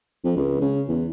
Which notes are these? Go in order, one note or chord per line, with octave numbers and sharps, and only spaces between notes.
F2
C#2
C#3
E2